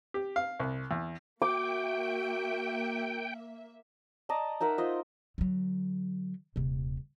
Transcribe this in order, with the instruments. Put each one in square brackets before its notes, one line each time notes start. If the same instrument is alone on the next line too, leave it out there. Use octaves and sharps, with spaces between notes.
[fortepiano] G4
F5
C2
E2
[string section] A#3 E5 [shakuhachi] F#4 [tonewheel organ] G5 [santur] D6
[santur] D5 D#5 A5 A#5
D#4 A#4 E5 F#5
F4 C5 D#5
[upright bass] D3 F#3
D#1 C3